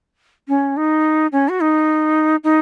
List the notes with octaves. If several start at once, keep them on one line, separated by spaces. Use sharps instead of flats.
C#4
D#4
C#4
F#4
D#4
D#4